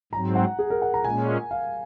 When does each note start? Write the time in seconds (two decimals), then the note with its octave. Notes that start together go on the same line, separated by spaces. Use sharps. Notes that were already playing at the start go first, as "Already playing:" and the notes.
0.13 G#2 F#3 C4 A#5
0.35 F#5
0.59 G#4
0.70 A#4
0.82 F#5
0.94 A#5
1.04 A#2 G#3 C#4 G#5
1.51 F5